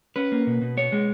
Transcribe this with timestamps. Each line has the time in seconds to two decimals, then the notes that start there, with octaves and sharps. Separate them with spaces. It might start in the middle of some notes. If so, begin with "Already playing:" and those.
0.16 C#4 B4
0.32 A#3
0.47 B2
0.62 B2
0.77 B3 C#5
0.92 G#3